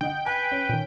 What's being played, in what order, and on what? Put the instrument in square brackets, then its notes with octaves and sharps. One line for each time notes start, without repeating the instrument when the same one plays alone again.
[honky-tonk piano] D3 D#5 F#5 [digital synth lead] G5
[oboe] B4 [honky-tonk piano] G#5
[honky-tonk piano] C#4
[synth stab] A#2 D#3